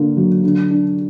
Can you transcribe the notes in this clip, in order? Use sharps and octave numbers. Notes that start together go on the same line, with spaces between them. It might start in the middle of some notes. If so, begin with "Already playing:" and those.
Already playing: D3 A#3
F#3
D3
D4